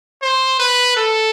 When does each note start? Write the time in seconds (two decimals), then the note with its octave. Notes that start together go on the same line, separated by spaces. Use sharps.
0.22 C5
0.60 B4
0.96 A4